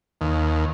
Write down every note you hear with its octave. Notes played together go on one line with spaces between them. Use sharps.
D#2